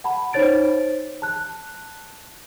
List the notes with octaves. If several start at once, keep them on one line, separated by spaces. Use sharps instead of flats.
F#5 A5 B5
D#4 C5 C#5 A6 D7
A5 F#6